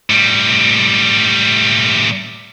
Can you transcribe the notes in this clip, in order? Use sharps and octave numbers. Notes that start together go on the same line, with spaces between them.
A2 G3